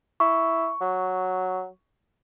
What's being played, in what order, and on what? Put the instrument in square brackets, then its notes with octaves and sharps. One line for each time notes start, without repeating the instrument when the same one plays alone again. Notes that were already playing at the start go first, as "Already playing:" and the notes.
[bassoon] E4 [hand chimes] C#6
[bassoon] F#3